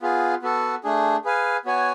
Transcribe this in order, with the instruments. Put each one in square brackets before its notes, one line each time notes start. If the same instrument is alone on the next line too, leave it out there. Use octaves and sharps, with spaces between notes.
[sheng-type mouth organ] B3 F4 G#4
B3 F#4 A4
A3 D4 G#4
G#4 B4 F5 G#5
B3 F#4 C#5 G#5